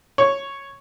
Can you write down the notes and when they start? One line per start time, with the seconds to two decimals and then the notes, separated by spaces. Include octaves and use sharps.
0.18 C#5